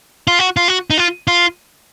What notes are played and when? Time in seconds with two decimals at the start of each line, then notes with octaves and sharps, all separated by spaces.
0.27 F4
0.39 F#4
0.57 F4
0.68 F#4
0.90 D#4
0.98 F4
1.27 F4